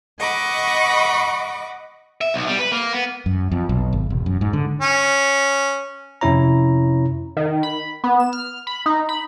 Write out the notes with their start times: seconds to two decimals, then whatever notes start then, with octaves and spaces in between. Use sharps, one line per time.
0.18 D#5 F#5 B5 C#6 D6
2.21 E5
2.34 B1
2.47 G3
2.59 B4
2.72 A#3
2.93 B3
3.26 F#2
3.52 F2
3.69 B1
3.93 G#1
4.10 E1
4.26 F#2
4.41 G#2
4.53 D3
4.82 C#4
6.21 F2 C3 C#4 E4 C#5 A#5
7.37 D#3
7.63 B5
8.04 B3
8.20 E7
8.33 F6
8.67 B5
8.86 D#4
9.09 B5